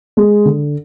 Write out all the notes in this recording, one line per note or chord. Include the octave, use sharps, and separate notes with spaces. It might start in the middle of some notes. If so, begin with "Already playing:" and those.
G#3
D3